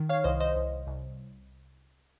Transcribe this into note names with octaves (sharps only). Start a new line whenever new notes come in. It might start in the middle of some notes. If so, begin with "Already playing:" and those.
Already playing: D#3
C#5 F5
C2 C5 D#5
C5 D#5
C2
C2